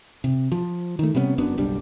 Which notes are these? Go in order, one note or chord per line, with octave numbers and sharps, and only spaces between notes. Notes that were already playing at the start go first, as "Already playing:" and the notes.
C3
F3
D#3 A3
C3 G3 B3 C#4
F#1 F#2 B3 D4
F#1 B1 G3 D4